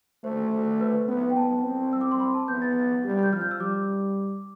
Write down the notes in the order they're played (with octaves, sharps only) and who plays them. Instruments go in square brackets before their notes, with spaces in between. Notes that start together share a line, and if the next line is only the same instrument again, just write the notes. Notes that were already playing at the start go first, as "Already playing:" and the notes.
[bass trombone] A3 [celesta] C5
[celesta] C5
B4
[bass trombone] B3
[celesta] G5
[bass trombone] B3 [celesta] A5
[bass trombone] C4
[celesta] E6
D6
C6
B5
A5
[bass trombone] B3 [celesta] G6
[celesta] A6
[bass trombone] G3
[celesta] G6
[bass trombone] F3 [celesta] F6
[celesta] G6
E6
[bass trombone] G3 [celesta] D6